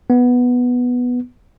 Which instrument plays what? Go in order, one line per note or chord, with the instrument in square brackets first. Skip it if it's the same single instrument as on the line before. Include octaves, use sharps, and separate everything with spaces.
[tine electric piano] B3